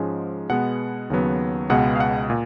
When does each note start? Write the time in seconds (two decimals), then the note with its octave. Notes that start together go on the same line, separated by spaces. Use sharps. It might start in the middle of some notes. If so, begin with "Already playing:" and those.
Already playing: G#2 F3 G#3 C#4
0.50 B2 G#3 B3 F#5
1.10 D#2 C#3 F#3 B3
1.70 C#2 B2 G#3 B3 F#5
1.96 F5
2.00 F#5
2.30 A#2